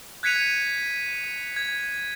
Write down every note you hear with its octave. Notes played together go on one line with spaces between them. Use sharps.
F#6 G#6 B6 C#7 D#7 F7
G#6